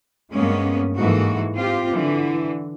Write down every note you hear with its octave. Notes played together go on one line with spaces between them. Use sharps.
G2 G#3 A#3 B3 C#4
G#2 E3 A#3 F#4 A4
C4 F4 G4
D3 E3